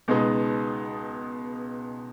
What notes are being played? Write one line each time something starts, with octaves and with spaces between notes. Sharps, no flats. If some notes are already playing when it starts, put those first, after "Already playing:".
C#2 B2 G#3 B3 D#4